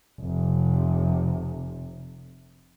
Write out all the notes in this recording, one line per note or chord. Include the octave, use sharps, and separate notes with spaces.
F1 C3